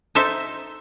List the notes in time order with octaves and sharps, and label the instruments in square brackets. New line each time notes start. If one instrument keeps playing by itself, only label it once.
[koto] D#4 A4 C5 E5